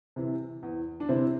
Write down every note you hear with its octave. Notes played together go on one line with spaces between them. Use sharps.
C3 E3
E2
D4
C3 E3 C4 E4